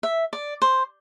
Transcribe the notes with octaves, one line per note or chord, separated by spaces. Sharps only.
E5
D5
C5